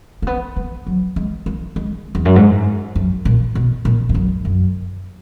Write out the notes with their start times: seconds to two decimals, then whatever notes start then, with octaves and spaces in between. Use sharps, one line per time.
0.22 A#3
0.27 B3
0.56 B3
0.87 F#3
1.16 G#3
1.46 A#3
1.76 G#3
2.15 E2
2.25 F#2
2.36 G#2
2.96 F#2
3.25 A#2
3.55 B2
3.85 A#2
4.09 E2
4.14 F#2
4.45 F#2